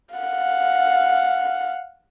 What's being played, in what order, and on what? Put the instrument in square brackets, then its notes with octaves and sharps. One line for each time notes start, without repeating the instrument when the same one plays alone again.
[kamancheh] F5 F#5